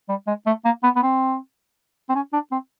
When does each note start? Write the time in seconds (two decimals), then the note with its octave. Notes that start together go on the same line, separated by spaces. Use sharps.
0.09 G3
0.27 G#3
0.46 A3
0.65 A#3
0.83 B3
0.96 B3
1.03 C4
2.09 C4
2.15 C#4
2.33 D4
2.52 C4